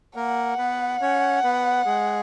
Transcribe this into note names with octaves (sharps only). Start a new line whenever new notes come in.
A#3 A#4 F#5
B3 B4
C#4 C#5
B3 B4
G#3 G#4